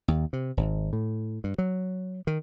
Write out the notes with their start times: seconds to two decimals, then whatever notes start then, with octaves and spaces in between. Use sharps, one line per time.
0.08 D#2
0.33 C3
0.57 G#1
0.93 A2
1.44 G2
1.58 F#3
2.27 D#3